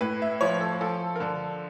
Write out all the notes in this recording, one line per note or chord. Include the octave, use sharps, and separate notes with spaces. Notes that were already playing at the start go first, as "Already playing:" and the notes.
A2 B4
E5
F3 C#5
A4
F3 A4
A#4
D3 A4